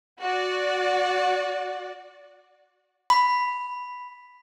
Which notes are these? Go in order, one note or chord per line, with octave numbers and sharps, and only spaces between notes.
F#4 D5
B5